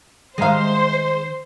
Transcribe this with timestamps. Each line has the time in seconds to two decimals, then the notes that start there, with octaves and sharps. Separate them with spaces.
0.38 D#3 G#3 C5 F5 A#5